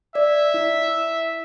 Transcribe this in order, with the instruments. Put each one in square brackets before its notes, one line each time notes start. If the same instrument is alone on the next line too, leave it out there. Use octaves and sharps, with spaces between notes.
[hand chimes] D5 [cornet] E5
[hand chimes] E4